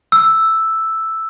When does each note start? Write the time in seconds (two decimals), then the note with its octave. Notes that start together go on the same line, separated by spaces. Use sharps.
0.12 E6